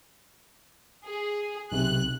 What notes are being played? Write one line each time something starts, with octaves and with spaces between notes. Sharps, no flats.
G#4
B1 C3 F#6